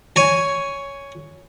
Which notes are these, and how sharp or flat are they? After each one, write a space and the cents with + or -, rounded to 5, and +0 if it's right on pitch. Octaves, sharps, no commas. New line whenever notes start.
C#5 +10 G#5 +0